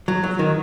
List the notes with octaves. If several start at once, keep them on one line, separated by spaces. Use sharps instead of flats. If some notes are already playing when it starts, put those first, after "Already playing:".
F#3
F#3
D#3